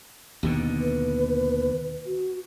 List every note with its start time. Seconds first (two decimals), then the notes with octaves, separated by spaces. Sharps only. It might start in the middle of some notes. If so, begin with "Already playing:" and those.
0.43 D#2 B2 D3
0.80 B4
2.06 F#4